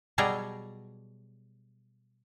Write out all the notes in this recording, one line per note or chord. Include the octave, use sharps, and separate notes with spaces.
B2 F#3 G3 G#4 G5 A#5